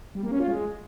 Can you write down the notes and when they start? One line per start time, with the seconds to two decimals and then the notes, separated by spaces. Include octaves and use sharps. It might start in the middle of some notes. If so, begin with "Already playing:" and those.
0.15 G3
0.23 A#3
0.31 C#4
0.40 F4
0.48 G#3